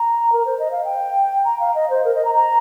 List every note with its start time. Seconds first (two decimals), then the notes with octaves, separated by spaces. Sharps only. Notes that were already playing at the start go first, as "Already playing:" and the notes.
Already playing: A#5
0.33 A#4
0.46 C5
0.59 D#5
0.71 F5
0.85 G5
1.45 A#5
1.60 F5
1.75 D#5
1.90 C5
2.05 A#4
2.15 D#5
2.25 A#5
2.35 A#5